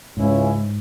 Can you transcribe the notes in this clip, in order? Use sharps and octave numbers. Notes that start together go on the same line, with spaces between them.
C#2 G#2 C#3 G#3 C#4 E4